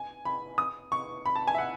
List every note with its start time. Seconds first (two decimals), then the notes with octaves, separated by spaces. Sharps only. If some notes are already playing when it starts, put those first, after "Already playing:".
Already playing: G#5
0.25 B5
0.58 D#6
0.92 C#6
1.26 B5
1.36 A5
1.47 G#5
1.55 E5
1.58 F#5